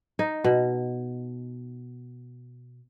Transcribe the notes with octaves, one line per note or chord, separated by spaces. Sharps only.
D#4
B2